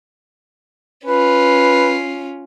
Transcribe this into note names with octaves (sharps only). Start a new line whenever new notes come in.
C#4 F4 B4